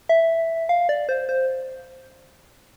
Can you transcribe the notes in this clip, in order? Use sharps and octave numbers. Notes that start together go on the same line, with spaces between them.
E5
F5
D5
C5
C5